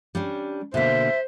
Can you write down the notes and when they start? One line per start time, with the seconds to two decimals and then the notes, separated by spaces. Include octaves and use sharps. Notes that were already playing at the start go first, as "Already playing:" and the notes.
0.15 G3 C#4 D4
0.74 B2 D3 A#3 C5 E5